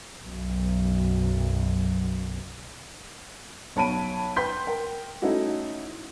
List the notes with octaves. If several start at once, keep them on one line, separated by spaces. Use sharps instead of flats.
B1 F#2
B1 C#5 A5 B5 D7 D#7
B4 G5 C6 G6 B6
A#4 G5
A3 C#4 D#4 E4 F#4